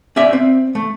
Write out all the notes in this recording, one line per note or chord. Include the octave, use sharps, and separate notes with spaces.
C#4 D5 E5
C4
A3